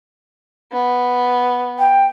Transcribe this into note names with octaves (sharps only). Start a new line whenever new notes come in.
B3
G5